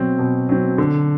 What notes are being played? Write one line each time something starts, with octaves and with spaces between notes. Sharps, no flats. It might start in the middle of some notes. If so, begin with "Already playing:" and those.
Already playing: B2 F#3 C4
B2
F#3 C4
D3